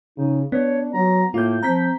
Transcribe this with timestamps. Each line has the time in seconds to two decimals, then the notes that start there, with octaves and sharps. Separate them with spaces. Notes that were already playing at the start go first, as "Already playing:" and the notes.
0.18 C#3 D#4
0.52 B3 D4 C#5
0.94 F#3 A#5
1.34 A2 A#3 F4 G6
1.63 F3 C4 A#5 G6 B6